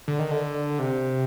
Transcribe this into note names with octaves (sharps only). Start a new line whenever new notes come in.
D3
D#3
D3
C3